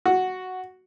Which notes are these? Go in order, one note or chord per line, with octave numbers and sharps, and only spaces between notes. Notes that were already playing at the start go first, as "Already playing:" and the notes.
F#4